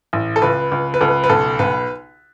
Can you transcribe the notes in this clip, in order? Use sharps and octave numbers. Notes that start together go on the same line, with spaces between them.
A1
A4
C#2 B4
C#2
B4
C#2 A4
B4
B4
B1 A4
B1 B4